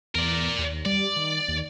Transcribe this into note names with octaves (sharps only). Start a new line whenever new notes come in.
E2 A#4 D5
D#2
G3 D5
D#3
D#2